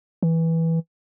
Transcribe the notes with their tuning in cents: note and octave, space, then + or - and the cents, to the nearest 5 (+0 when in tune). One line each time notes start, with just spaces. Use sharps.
E3 -10